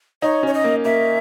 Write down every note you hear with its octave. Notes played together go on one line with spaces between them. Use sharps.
D#4 C#5
C#4 C#5
D#5
A#3
A#3 E5